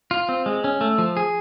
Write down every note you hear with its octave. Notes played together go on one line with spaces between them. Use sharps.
F4
C4
G#3
C#4
A3
F3
G#4